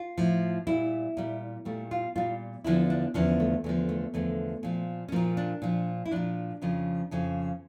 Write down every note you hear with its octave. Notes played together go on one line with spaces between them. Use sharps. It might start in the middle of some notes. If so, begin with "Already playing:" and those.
Already playing: F4
A2 F3
A#2 G3 E4
A#2 G3
A#2 G3 A3
F4
A#2 G3 F4
E2 D3 F3 E4
D4
E2 D3 F3 C#4
A3
E2 D3 F3 A3
A3
E2 D3 F3 A3
A#2 F3
C#4
A#2 F3 A#3
D4
A#2 F3
E4
A#2 F3 D4
F2 C#3 F3
F2 C#3 F3